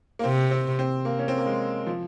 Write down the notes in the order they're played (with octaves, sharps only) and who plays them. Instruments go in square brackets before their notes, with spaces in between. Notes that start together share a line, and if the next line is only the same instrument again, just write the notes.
[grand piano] A#3
[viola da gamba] C3 [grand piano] C4
[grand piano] C4
C4
A#3
C#4
C4
A#3
G#3
F3